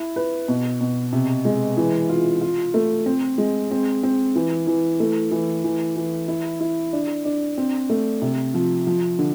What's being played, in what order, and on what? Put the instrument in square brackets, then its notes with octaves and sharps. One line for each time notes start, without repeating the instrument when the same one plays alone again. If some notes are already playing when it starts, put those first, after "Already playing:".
Already playing: [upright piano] E4
B4
B2
B2
C3
G#3
E3
F4
F4
A3
C4
G#3
C4
C4
E3
E3
A3
E3
E3
E3
E4
E4
D4
D4
C4
A3
C3
F3
F3
D3